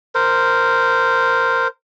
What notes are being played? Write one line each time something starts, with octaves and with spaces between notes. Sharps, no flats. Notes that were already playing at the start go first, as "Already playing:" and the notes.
A#4 C5